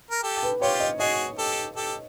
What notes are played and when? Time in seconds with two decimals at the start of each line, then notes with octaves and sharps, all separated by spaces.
0.11 A#4
0.23 G4 A4
0.43 B4
0.61 F4 G4 C#5
0.80 D#5
1.00 F#4 G#4 D#5
1.39 G4 A4
1.76 G4 A4